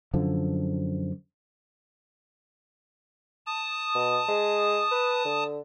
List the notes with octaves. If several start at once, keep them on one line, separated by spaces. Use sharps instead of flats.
F#2 D3 F3
A5 D#6
B2
G#3
B4
D3